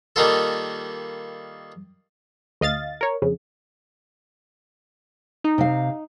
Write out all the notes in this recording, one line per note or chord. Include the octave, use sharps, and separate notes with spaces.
D#3 G3 A#3 D#4 F4 A4
D2 D#5 F5 A6
A#4 C#5
F2 C#3
D#4
C3 F5